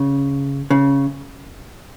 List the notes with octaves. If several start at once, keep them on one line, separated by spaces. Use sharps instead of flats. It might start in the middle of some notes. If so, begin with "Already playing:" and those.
Already playing: C#3
C#3